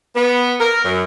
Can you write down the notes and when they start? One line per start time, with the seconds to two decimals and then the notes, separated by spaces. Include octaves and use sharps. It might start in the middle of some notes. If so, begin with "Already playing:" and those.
0.15 B3
0.59 A#4
0.83 F#2